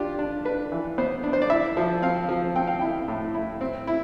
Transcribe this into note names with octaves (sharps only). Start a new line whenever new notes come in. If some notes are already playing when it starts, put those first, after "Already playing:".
Already playing: D4 F4 G4
D4
D4 B4
E3
B3 C5
D4
C5
D5
E4 E5
F3
C4 F5
F3
C4 G5
F5
E4 G5
A2
E4
C4
E4